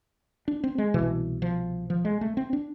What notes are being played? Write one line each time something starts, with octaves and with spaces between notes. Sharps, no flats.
D4
C4
G#3
C2 B2 E3
F3
F3
G#3
A3
C4
D4